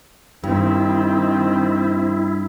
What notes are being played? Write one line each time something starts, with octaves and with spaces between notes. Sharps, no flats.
G2 D#3 C4 E4